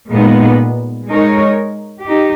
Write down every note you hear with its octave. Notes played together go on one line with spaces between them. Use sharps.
A#2 G#3 B3 D#4
G#3 D#4 A#4 C#5
D#4 G4